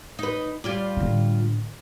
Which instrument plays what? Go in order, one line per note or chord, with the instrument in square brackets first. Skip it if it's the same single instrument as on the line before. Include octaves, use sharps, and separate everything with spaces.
[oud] D#4 B4
G3 F4 D5
[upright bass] A2 D3